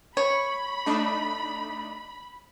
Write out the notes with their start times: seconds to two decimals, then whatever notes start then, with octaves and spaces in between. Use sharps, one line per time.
0.17 C#5 B5
0.86 A3 D4 D#4